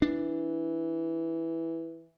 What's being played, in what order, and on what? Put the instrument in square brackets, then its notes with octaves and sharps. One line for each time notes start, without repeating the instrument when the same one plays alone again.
[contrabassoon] E3 [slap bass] D4